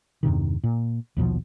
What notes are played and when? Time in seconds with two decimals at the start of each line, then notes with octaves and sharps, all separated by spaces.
0.23 E2 G2 C3 D#3
0.64 A#2
1.17 A#1 D#2 B2 F3